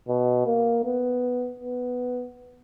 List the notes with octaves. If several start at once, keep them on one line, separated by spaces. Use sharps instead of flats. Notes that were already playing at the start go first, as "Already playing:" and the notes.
B2
A#3
B3
B3